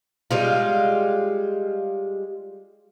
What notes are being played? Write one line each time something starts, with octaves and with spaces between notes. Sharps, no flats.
G3 G#3 F4